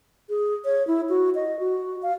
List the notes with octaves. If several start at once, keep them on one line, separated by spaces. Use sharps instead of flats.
G#4
C#5
E4
F#4
D#5
F#4
F5